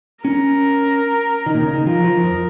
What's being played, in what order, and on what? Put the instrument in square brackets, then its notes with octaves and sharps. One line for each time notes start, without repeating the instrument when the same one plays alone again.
[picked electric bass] C#4 [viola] A#4
[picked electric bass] D#3
A#2
C#3
D#3
[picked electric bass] F3 [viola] A#4
[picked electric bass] F3
F2